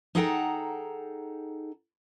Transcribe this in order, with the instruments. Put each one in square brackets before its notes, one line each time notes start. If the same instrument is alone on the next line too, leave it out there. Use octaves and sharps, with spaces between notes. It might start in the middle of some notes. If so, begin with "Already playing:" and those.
[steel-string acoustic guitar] D#4 G#4 A4 F#5 G5 A#5